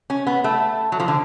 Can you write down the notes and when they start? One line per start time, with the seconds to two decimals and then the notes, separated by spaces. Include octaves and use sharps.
0.10 C#4
0.27 B3
0.44 A3
0.92 F#3
1.00 F3
1.08 D3